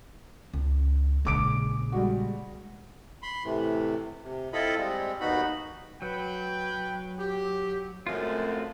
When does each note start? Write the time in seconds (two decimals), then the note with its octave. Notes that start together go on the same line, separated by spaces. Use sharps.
0.54 C#2
1.25 A#1 C#3 G#3 D6 D7
1.92 G3 G#3 F#4
3.23 B5 C6
3.44 A2 C3 E3
4.24 C3
4.53 C4 E4 F4 A4 D#5 B5
4.78 G3 G#3 C4
5.20 D#2 B3 D#4 F#4 B5
6.02 F#3 B4 G5
7.19 G4
8.07 F#2 F3 G#3 A3 C4 F4